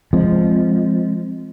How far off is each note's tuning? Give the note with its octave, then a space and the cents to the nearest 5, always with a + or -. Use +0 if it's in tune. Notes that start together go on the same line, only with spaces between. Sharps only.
F3 -10 G#3 +0 C4 +0